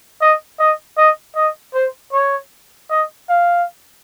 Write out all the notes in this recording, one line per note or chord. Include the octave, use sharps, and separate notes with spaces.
D#5
D#5
D#5
D#5
C5
C#5
D#5
F5